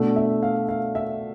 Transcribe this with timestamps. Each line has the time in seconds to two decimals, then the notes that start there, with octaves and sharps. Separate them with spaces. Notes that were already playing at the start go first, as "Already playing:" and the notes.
Already playing: B2 A3 D4
0.16 E5
0.43 F5
0.69 F5
0.95 E5